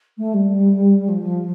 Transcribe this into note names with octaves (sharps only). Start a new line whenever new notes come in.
A3
G3
F3